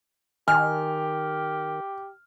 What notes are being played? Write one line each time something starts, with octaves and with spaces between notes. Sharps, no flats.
D#3 G4 G#5 F6